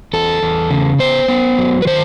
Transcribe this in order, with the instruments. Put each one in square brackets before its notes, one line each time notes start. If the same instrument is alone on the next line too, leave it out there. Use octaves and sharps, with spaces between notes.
[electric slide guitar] E2 A4
E2
C#3
B3 C5
B3
F#3
B4
D#3 C5